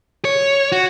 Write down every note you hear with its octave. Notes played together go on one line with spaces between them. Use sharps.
C#5
F#4